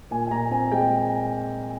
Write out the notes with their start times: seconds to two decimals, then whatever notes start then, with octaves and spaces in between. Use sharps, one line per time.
0.11 A#2 G#5
0.27 G#5
0.31 A#2 A#5
0.51 C4 G#5
0.71 G#3 G5